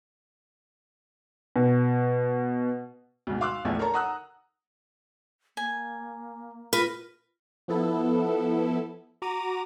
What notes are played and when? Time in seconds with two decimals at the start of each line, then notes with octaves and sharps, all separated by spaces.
1.56 B2
3.27 D2 G#2 B2
3.41 F5 C6 D6 E6 F#6
3.65 A#1 E2 F3 A3
3.79 A4 A#4 C#5 A5 A#5
3.94 F#5 A#5 D#6 E6 F#6
5.57 A#3 G#5
6.73 F4 A#4 B4
7.68 F3 B3 E4 A4
9.22 F#4 A#5 D6 D#7